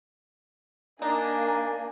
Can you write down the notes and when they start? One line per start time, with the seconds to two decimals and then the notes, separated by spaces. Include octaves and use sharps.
1.02 A#3 D4 D#4 G#5